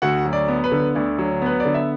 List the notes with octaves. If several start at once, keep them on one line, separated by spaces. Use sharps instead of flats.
D2 F#4 F#5
F#3
D5
B3
B4
D3
D2 D5
F#3
B3 B4
D5
D3
E5